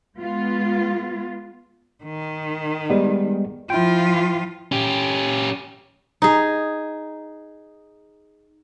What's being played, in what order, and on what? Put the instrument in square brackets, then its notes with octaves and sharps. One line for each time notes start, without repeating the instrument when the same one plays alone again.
[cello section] G#3 B3 F4
[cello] D#3
[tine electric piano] G3 G#3 B3
[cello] F3 F4 [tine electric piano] E4 G5
[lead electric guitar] C#4 G4
[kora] D#4 G#4